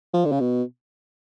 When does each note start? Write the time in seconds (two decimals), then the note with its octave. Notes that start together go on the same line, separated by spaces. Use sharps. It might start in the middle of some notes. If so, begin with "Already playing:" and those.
0.14 F3
0.25 D3
0.32 C#3
0.40 B2